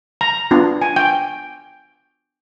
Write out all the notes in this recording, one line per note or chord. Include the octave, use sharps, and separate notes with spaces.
A#5
B3 D4 F4
G#5
G5